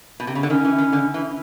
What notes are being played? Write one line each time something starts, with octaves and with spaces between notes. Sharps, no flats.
B2
C3
C#3
D3
D#3 C#4
E3
D#3
D3
E3